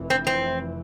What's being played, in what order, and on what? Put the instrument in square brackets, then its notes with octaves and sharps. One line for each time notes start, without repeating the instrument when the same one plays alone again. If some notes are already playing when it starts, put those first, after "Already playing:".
Already playing: [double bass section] F1 F2 E3
[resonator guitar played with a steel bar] C4
C4